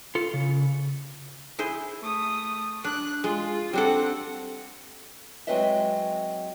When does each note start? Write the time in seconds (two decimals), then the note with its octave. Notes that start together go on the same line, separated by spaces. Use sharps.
0.15 F4 A4
0.33 C#3
1.59 E4 G#4 C5
2.01 A3 D#6
2.84 D4 F#6
3.24 G#3 F4
3.73 G3 C4 D4 A4 F#5
5.47 F#3 G#3 C4 B4 D#5 E5